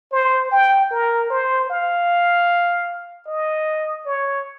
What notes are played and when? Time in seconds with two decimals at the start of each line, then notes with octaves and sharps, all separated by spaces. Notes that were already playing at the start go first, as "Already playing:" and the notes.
0.12 C5
0.51 G5
0.91 A#4
1.30 C5
1.70 F5
3.27 D#5
4.06 C#5